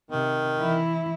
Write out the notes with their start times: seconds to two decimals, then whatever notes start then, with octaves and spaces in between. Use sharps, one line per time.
0.11 C3 D#3
0.59 E3 E4